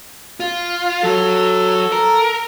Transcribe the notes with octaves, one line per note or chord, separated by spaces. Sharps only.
F4
F#3 F#4 A4
A#4